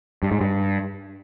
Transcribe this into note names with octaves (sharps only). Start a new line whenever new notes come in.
G2
G#2
G2